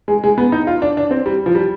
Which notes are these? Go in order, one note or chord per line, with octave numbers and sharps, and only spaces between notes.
G#3
G#3
B3
D#4
F4
D4
D4
C4
G3
F3
G3